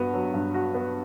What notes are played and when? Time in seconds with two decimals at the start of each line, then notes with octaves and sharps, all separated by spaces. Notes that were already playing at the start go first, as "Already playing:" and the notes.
Already playing: G2 B3 F#4
0.14 F#3
0.34 G2
0.54 F#4
0.74 B3